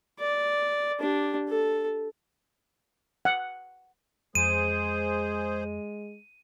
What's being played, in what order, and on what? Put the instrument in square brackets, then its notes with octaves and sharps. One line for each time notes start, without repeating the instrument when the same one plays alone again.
[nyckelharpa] D5
D4 G4
A4
[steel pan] F#5
[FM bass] F2 [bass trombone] G#3 [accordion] G#4 C5 [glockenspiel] D#7